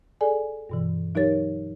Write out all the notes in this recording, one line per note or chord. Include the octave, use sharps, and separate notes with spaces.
G#4 A4 D5 G#5
G2 B2 E3
F#3 D#4 G4 A#4 C#5 A6